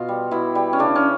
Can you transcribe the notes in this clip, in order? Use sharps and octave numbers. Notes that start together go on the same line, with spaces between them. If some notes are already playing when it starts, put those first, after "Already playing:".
Already playing: B2 F4
G3
B2 E4
G3
C#4
C#3 D4
C#4